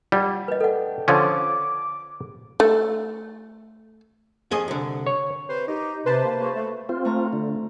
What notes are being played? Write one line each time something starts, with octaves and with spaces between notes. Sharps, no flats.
G3 F4 D5 F#5
C2 F#2 B4 D#5
A3 D4 A4 F#5 G5
D3 F3 C#4 D6
A3
F2 G#4 D#5
C2 D3
C#5
C3 B4 C5
D#4 G4
C3 B4 C5 A5
A#3
C#3 A#3 F#4
A3
C4 F4 C5
A3 A#5
D3